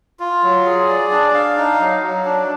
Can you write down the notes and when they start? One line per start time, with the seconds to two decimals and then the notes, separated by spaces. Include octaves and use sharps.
0.20 F4
0.43 F#3
0.66 G#4
0.88 D5
1.11 D4
1.34 F5
1.57 D#4
1.80 F#3
2.02 F#3
2.25 D4